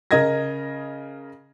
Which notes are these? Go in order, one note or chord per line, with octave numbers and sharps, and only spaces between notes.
C#3 A#4 D#5 G#6 A#6